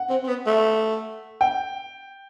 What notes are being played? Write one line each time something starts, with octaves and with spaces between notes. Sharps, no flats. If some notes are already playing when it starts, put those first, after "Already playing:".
Already playing: F#5
C4
C4
B3
A3
G5